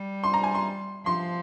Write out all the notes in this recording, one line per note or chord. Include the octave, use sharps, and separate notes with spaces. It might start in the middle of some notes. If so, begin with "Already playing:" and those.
Already playing: G3
C6
A#5
G#5
C6
F3 C6